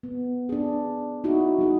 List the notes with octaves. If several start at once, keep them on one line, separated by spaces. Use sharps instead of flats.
B3
D4 G#4
D#4 E4 F#4
G3 D#4 G#4